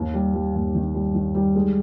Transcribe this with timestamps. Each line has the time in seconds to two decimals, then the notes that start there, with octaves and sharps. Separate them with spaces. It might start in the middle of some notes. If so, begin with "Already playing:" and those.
Already playing: D#2
0.14 G3
0.34 G3
0.54 D#2
0.75 D#3
0.94 G3
1.15 D#3
1.35 G3
1.55 G#3